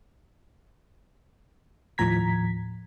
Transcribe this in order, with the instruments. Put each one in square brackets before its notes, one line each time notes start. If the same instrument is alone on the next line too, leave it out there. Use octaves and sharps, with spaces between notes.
[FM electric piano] D#2 A2 F3 A#5 G#6 B6